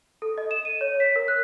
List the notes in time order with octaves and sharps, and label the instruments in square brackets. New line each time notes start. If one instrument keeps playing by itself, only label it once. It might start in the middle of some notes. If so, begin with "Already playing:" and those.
[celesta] A4
D#5
E7
D#7
C#5
B6
A#4
F#6